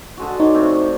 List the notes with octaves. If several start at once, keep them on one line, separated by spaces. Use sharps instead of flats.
D3 G#3 F#4
D#4 C#5 D5
A2 C3